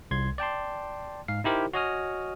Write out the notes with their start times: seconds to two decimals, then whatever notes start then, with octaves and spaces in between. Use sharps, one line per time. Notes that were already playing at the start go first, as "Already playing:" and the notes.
0.11 C2 C6 G#6
0.38 D5 G5 A5 C6
1.28 G#2 F5 C7
1.44 D#4 E4 G4 A#4 C5
1.73 F#4 C#5 D#5 G#5 D#6 F6